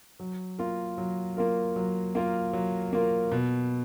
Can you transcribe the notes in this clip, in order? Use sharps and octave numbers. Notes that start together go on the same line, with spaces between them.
F#3
A#3 F4 A#4
F#3
A#3 F4 A#4
F#3
A#3 F4 A#4
F#3
A#3 F4 A#4
B2